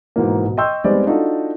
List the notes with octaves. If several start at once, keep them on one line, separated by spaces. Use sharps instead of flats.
G#2 B2 E3 A#3
B2
D#5 G5 C6 C#6 E6 G6
G3 G#3 B3 C4 D#4 D5
D4 D#4 F4 F#4 A4